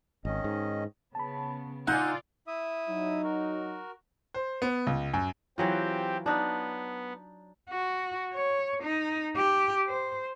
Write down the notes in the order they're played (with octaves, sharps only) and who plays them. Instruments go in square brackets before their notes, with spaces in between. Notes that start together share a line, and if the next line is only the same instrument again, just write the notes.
[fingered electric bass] G#1 [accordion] D#3 C#4 D#5
[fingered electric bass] G#2
[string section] C#3 B3 [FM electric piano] A5 B5
[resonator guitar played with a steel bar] D#4 G#5 [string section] F4 D5 [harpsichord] F#5 [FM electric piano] E6 F6
[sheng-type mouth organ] E4 E5 D#6
[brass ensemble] F#3 D#4
[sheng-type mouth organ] F#4 A#4
[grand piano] C5
B3
C#2
F#2
[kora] E3 F#3 F4 [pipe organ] C4 G4
[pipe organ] B3 [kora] D4 D#4
[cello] F#4
C#5
D#4
G4
C5